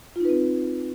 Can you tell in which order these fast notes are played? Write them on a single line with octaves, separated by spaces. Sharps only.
F4 D#4 B4 C4